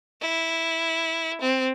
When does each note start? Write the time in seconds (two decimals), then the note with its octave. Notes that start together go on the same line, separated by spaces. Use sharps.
0.21 E4
1.41 C4